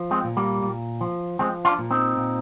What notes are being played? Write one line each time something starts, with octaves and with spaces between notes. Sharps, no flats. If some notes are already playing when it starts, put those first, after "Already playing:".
Already playing: F3
G#3 C4
A#2
G3 A#3
A#2
F3
F3 G#3 C4
D4 F4
A#2
C4 D#4
A#2